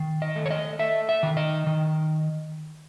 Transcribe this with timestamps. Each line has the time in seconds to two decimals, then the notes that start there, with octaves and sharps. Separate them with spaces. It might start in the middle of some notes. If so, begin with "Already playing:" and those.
Already playing: D#3
0.22 D#5
0.36 A3
0.46 C#5
0.51 D#5
0.79 A3 E5
1.09 E5
1.23 D#3
1.37 D#5
1.67 D#3